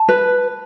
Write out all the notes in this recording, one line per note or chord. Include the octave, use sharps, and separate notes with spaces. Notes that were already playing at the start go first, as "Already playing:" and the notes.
Already playing: A5
B4